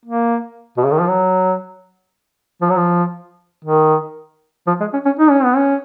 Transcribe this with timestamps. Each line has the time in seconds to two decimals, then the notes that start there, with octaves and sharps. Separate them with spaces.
0.05 A#3
0.77 B2
0.85 C#3
0.92 D#3
1.00 F3
1.08 F#3
2.61 F3
2.70 F#3
2.77 F3
3.64 D#3
4.67 F3
4.80 G#3
4.93 C#4
5.05 C#4
5.19 D#4
5.30 C#4
5.44 B3
5.56 C#4